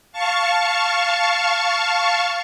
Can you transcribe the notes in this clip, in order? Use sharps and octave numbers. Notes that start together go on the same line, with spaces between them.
F5 A5 C#6